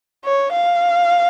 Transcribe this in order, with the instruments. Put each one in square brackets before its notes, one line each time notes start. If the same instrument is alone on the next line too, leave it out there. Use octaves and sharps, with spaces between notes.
[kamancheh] C#5
F5